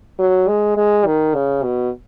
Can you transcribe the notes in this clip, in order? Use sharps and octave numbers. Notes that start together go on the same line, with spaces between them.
F#3
G#3
G#3
D#3
C#3
B2